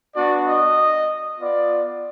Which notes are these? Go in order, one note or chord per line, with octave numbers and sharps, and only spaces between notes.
B3 D4 F#4 D5
D#5
B3 F4 D5